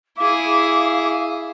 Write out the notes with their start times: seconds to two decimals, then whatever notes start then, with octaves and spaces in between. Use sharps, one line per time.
0.17 E4 G#4 F5 D6